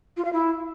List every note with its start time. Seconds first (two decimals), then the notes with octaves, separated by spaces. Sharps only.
0.17 F4
0.25 F5
0.33 E4